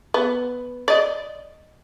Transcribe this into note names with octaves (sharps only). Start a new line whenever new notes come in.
B3
D5 D#5